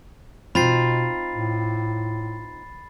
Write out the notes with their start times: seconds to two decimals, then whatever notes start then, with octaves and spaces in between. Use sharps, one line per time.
0.55 B2 C4 D#4 F4 B5 A6 C7
1.33 A2